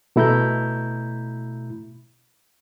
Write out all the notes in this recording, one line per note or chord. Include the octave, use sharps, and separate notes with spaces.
B2 A3 E4 A#5 B5 G6